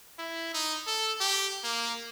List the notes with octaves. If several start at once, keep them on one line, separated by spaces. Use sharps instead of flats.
E4
D#4
A4
G4
A#3